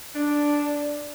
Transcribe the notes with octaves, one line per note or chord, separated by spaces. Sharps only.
D4